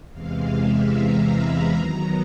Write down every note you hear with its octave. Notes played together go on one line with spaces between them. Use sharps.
E2 C3 E3 G#3 F5
E5
A#5
B5
D#3 F#3 B3 A#5